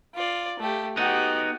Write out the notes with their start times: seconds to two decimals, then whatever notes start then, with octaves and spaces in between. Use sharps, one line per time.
0.14 F4 D5
0.60 A3 G4
0.97 B3 D#4 F#4 G4